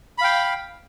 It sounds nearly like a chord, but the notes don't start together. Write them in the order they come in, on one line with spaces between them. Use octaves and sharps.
B5 F5 G5